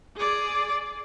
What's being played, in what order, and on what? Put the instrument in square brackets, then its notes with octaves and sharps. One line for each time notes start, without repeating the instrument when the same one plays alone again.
[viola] G#4 D5